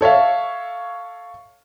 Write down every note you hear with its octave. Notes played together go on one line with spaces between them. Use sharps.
A4 C#5 E5 F5